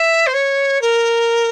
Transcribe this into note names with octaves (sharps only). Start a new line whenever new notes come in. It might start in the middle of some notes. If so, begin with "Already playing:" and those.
Already playing: E5
C5
C#5
A#4